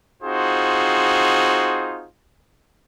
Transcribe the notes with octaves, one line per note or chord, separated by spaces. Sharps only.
C4 D#4 F4 F#4 G#4 C5